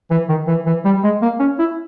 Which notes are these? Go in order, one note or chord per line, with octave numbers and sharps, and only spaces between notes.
E3
D#3
E3
E3
G3
G#3
A#3
C#4
E4